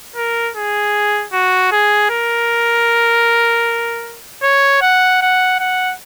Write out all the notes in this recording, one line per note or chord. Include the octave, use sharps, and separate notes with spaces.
A#4
G#4
F#4
G#4
A#4
C#5
F#5
F#5
F#5